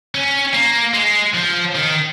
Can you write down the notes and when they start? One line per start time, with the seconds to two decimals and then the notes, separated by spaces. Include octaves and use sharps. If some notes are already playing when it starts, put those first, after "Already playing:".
0.14 C#4
0.54 A#3
0.94 G#3
1.34 F3
1.75 D#3